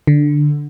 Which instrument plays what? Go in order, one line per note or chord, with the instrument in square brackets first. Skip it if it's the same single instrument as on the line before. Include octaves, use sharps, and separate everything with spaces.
[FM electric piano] D3